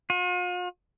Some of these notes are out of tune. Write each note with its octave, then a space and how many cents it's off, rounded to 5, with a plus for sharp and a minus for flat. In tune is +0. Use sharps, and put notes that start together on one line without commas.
F4 +45